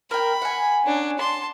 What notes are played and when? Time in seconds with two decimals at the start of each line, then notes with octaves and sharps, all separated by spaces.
0.11 A#4 G5 B5
0.42 F#5 G#5
0.84 C#4 D4
1.18 A5 C6